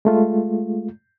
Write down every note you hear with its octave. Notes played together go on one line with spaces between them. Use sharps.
G#3 A3 F4